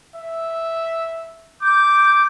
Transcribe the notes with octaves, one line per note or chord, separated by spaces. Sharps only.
E5
D6 G6